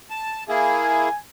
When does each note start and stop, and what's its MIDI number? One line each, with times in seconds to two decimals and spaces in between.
0.10 0.44 81
0.49 1.09 58
0.49 1.09 64
0.49 1.09 68
0.49 1.18 80